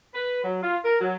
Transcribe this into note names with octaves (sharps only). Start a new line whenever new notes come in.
B4
F#3
F4
A#4
F#3